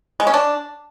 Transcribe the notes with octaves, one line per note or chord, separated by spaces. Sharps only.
G#3
C#4
D4